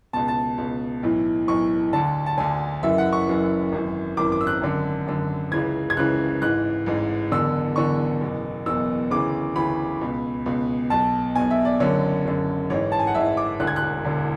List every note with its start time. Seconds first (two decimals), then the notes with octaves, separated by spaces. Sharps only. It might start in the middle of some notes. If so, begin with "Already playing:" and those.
0.13 C#2 B2 A5
0.28 A5
0.58 C#2 B2
1.03 B1 A2 E3
1.48 B1 A2 E3 C#6
1.93 D2 D3 A5
2.26 A5
2.38 D2 D3 G#5
2.83 F#1 F#2 E3 E5
2.98 F#5
3.13 C#6
3.27 F#1 F#2 E3
3.72 G#1 F#2 E3
4.17 G#1 F#2 E3 D6
4.32 D6
4.41 E6
4.47 F#6
4.62 G#1 F#2 D3
5.07 G#1 F#2 D3
5.51 C#2 C#3 E3 G#6
5.90 G#6
5.97 C#2 C#3 E3 F#6
6.41 A1 G#2 E3 F#6
6.86 A1 G#2 E3
7.32 F#1 E2 D3 E6
7.76 F#1 E2 D3 C#6
8.21 F#1 E2 B2
8.66 F#1 E2 B2 E6
9.10 D2 C#3 E3 D6
9.56 D2 C#3 E3 B5
10.01 C#2 B2
10.46 C#2 B2
10.90 B1 B2 A5
11.35 B1 B2 G#5
11.51 E5
11.65 D5
11.80 F#1 F#2 D3 C#5
12.25 F#1 F#2 D3
12.70 A1 G#2 E3 C#5
12.92 A5
12.99 G#5
13.07 F#5
13.15 A1 G#2 E3 E5
13.37 D6
13.60 E1 D2 D3 F#6
13.67 G#6
13.76 F#6
14.05 E1 D2 D3